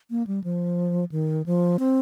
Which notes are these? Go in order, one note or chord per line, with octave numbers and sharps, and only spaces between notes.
A#3
G3
F3
D#3
F3
C4